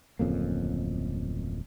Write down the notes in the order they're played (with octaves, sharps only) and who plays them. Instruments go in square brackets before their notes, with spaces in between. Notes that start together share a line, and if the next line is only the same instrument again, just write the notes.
[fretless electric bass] D1 F2 C#3 A#3